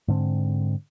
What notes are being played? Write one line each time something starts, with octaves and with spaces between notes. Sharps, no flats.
G#2 D3 C4